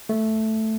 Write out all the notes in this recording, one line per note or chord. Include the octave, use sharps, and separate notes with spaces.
A3